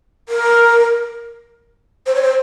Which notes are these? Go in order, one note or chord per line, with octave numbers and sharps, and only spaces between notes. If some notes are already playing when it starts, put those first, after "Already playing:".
A#4
C5
C#5
C5